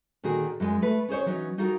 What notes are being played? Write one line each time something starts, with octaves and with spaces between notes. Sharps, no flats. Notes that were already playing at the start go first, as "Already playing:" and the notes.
A#2 D3 D#3 F#4 G#4
F#2 G#3 G#5
A3 B4
C#4 G#4 C5 C#5
E3 F#3 C#4 D#4
G3 D#4 F4 F#4 G#4 A#4